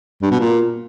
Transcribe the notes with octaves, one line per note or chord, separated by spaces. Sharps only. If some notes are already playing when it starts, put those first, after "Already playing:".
G2
B2
A#2